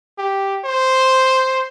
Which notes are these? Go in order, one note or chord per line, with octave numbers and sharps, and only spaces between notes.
G4
C5